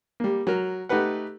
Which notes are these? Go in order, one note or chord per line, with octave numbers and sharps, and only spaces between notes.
G3 A#3
F#3 A#4
A3 D#4 G4 B4 F#5